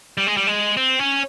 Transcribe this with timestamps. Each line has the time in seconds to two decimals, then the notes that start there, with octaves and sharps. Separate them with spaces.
0.18 G3
0.27 G#3
0.37 G3
0.47 G#3
0.77 C4
0.99 C#4